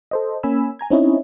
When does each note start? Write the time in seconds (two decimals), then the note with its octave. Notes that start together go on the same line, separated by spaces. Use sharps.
0.11 A4 C5 D#5
0.43 A#3 C#4 G#5 B5 E6
0.79 G#5 A#5 G#6
0.90 C4 C#4 D#4 E4 C#5 D#5